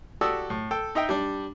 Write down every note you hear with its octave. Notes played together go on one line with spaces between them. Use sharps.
F#4 G4 A4 D5 D#6 E6
A2
A4 G5
D#4 D#5 E5 G5
G3 D4